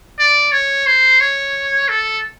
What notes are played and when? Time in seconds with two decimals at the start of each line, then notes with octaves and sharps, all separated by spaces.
0.19 D5
0.52 C#5
0.86 C5
1.21 C#5
1.89 A4